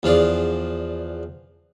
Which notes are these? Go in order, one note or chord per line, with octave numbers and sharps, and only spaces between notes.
E2 F3 G#4 D5